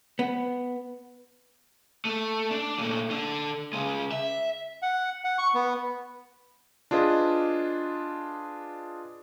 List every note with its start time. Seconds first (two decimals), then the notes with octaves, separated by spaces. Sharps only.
0.19 B3
2.05 A3
2.51 D4
2.79 A#2 A3
3.11 D3 D4
3.73 C#3 G#3
4.12 E5
4.82 F#5
5.24 F#5
5.38 C#6
5.54 B3
6.91 D4 F4 G#4 B4 D#5